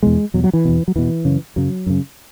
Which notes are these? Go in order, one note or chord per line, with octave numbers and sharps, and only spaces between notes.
E2 B2 G#3
E2 B2 F#3
F#3
E3
E2 B2
F#3
E2 B2 E3
F#2 C#3
F#2 C#3 F#3
F#2 C#3